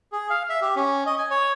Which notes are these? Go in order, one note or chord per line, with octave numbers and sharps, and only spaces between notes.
G#4
F5
E5
G4
C#4
D#5
G#5
C#5